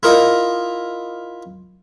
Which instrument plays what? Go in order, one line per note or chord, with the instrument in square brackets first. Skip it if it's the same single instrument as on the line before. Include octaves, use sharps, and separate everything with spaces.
[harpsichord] E4 F4 A#4 D#5 A#5